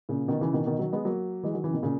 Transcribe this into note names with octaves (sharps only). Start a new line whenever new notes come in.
A#2 C#3
B2 D#3
C#3 E3
B2 D#3
B2 D#3
D#3 F#3
G#3 B3
F#3 A#3
E3 G#3
D#3 F#3
C#3 E3
B2 D#3
A#2 C#3